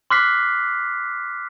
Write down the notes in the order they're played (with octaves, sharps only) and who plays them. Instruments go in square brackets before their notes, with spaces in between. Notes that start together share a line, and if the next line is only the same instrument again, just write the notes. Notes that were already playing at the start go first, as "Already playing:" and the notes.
[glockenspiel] C6 D6 F6 F#6 B6 C7